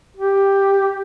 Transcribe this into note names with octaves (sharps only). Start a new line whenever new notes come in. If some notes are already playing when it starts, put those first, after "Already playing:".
G4